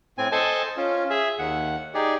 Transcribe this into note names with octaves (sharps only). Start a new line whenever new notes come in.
A2 C4 G#5
A4 C5 D#5 G#5 A5
C#4 F4
G#4 E5
D#2 F#5
D#4 G4 G#4 D5